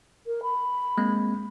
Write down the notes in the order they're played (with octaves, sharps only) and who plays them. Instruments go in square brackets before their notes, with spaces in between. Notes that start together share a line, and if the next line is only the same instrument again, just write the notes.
[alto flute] A#4
B5
[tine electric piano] G#3 A#3 C4